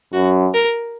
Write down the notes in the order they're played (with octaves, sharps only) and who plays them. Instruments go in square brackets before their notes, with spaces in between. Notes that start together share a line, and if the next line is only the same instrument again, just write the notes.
[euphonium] F#2 [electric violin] F#4
[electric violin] A#4